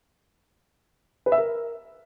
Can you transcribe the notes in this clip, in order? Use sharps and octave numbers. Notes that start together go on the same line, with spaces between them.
B4
E5
A#4